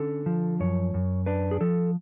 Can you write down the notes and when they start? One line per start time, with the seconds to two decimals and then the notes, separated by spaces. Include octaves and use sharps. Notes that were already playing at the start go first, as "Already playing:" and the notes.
Already playing: D3 C#4 A4
0.26 F3
0.60 F#2 C#5
0.94 F#2
1.26 D4 B4
1.51 G#4
1.61 F3 A4